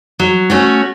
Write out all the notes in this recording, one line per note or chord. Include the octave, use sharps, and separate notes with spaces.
F#3
A3 C#4 F#4